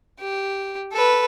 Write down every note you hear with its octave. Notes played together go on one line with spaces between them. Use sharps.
G4
A4 B4